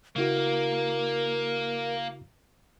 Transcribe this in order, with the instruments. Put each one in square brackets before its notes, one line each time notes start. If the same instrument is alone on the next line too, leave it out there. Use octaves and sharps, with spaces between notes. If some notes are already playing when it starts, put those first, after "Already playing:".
[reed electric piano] C#3 E4 F#4 [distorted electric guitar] A#3 [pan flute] A#4